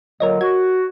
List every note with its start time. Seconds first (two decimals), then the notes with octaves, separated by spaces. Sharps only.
0.20 A#2 D3 F#3 A#4 C#5 D#5
0.41 F#4 G#6